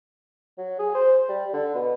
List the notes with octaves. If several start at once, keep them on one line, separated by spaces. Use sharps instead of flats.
F#3
G#4
C5
G3
D3
B2